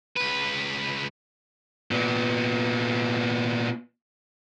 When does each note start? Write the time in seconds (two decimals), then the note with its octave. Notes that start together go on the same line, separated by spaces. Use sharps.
0.17 C#2 B4
1.91 A#2 B3